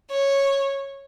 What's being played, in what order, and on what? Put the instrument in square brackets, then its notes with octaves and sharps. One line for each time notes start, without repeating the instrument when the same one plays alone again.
[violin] C#5